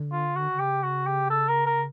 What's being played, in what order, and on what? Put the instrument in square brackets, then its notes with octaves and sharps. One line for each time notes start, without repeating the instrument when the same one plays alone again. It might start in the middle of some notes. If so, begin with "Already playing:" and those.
Already playing: [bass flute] D3
[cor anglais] F4
F#4
[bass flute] D3
[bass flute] C#3 [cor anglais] G4
[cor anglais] F#4
G4
A4
A#4
A#4